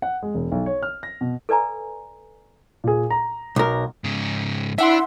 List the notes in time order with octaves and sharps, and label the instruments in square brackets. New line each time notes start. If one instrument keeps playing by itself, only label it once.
[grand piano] F#5
G#3
E1
B1
C#5
F6
A#6
B2
[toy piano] A4 B4 D5 G#5 A#5
[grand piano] A#2 G#4
A#5
[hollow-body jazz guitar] B1 A#4
[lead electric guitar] G#2 C#3
[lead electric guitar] D4 [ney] E4 [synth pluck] E5 F#5 C6